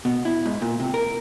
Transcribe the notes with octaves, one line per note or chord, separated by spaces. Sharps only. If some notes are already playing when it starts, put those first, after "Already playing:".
B2
E4
G#2
A#2
C3
A#4